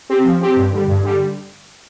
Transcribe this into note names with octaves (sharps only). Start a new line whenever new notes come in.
C4 G4
F3
C4 G4
G2
D3 G3
G2
D3 G3